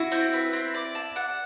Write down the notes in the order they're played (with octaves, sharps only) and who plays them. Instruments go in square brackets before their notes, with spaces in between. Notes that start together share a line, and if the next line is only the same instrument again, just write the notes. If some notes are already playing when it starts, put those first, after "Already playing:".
Already playing: [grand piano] E4 [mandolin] F#4
[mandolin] C4
B4
C4
D5
A5
F#5